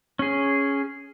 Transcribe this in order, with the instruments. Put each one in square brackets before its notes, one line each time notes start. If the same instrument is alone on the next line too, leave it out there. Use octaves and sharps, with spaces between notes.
[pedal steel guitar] C#4 G#4